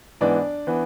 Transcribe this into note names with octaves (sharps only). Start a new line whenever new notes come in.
G#2 E3 B3 D4 D5
E3 B3